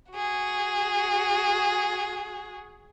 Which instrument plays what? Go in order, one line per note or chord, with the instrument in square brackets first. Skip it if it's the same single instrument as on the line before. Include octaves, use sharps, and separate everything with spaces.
[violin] F#4 G#4